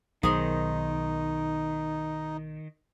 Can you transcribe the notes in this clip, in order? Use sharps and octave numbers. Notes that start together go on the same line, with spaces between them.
B1 D#3 D#4 G#4 A#4 C5